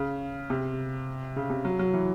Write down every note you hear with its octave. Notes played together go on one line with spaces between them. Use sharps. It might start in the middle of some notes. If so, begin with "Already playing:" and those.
Already playing: C#3
C3
C#3
C3
F#3
F#3
E3